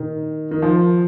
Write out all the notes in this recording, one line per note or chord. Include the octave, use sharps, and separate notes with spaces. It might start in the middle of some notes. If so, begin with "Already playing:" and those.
Already playing: A#2 D#3
D#3
F3